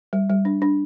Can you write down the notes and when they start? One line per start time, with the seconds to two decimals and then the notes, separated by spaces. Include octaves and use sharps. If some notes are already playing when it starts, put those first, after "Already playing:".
0.13 G3
0.30 G3
0.45 D4
0.62 D4